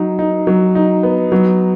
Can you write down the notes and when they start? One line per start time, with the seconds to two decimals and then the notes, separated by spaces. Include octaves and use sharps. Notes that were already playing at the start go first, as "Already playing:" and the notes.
Already playing: F#3 D#4
0.19 D#4
0.47 F#3
0.75 D#4
1.03 B3
1.32 F#3